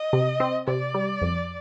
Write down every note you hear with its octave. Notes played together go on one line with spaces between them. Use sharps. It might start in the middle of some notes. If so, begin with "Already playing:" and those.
Already playing: D#5
C3
C4
C3 D5
G3
F2